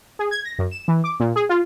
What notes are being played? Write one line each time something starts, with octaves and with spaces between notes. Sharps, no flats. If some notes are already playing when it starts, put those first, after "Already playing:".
G#4
G#6
A#6
F#2
E7
E3
D6
A#2
G#4
F4